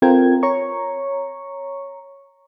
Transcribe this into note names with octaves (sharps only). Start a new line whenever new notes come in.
C4 F4 A4 A#4 G5 G#6
C#5 A#5 C#6